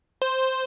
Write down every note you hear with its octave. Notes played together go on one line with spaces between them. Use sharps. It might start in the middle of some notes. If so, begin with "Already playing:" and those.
C5